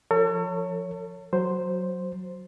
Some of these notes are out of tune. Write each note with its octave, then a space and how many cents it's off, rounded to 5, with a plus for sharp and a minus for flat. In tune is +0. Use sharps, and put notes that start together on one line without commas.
F3 +0 A4 +45 C#5 +0
F#3 +0 C5 +0